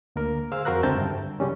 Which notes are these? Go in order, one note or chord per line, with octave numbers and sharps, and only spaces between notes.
D2 A#3 A#4
G#4 C5 F5 E6
F2 F#4 A#4 C5 A#5 F#6
C#2 D3 C4 E5 A5 G6
G2
C#3 F#3 G3 C#4